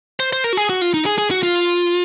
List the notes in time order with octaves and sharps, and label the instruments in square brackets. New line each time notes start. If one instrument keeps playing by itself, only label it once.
[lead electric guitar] C5
C5
A#4
F#4
G#4
F#4
F4
D#4
G#4
G#4
F#4
F4